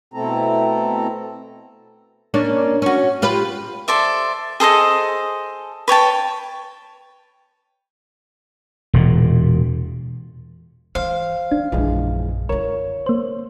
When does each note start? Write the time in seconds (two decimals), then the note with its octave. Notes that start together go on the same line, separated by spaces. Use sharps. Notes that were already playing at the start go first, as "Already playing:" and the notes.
0.14 B2 A3 C4 E4 A4 A#5
2.34 A#3 C#4 D4
2.82 C#4 F#4
3.22 F4 G4 B4
3.88 A4 C5 D5 E5
4.60 G#4 A4 C5 D#5
5.88 B4 C#5 G5 A5
8.94 E1 A#2
10.95 E3 C5 F5
11.51 E3 D4
11.72 A#1 F#2 E3 F3 G#3
12.49 D3 E4 A#4 C#5
13.06 A#3 C5